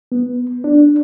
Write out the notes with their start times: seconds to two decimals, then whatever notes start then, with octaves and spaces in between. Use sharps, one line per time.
0.12 B3
0.64 D4